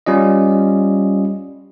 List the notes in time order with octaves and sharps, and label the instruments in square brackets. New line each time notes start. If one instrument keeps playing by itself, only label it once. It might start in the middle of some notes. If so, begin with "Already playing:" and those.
[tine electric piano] G3 C#4 F4 D#5